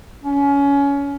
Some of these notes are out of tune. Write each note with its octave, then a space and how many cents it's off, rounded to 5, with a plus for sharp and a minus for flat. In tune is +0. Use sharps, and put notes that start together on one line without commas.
C#4 +25